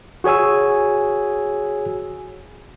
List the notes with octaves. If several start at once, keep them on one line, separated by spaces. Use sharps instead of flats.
F#4 G#4 C#5 G#5 E6